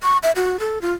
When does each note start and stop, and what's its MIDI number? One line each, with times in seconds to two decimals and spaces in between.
0.03 0.17 85
0.23 0.31 76
0.36 0.59 66
0.60 0.81 69
0.82 0.93 65